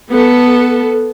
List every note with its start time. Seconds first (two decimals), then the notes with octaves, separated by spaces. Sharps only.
0.10 B3 A4